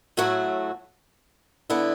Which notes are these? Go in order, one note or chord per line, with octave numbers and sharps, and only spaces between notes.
A2 F#3 A3 F#4
D3 B3 E4